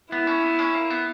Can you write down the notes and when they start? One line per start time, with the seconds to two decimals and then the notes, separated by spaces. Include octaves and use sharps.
0.12 B3 E4
0.27 C#4
0.43 B3
0.59 C#4
0.75 A#3
0.90 B3